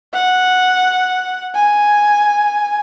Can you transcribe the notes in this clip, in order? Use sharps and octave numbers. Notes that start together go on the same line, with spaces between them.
F#5
G#5